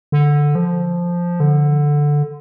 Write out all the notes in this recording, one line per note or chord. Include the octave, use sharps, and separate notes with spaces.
D3
F3
D3